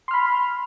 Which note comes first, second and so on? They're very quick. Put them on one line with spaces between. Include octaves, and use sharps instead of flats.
C6 F6 B5